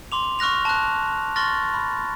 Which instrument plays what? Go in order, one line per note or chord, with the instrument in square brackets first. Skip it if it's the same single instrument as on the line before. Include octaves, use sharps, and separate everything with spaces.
[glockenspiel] C6 D6 F7
C#6 F6 F#6 A#6 F7
A5 F#6
C6 C#6 F6 A6 A#6
B5